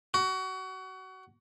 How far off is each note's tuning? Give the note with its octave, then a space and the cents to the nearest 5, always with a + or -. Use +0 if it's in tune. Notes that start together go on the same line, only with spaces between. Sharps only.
F#4 +25